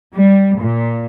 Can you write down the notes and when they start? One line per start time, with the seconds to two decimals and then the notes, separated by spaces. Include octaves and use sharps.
0.15 G3
0.58 A#2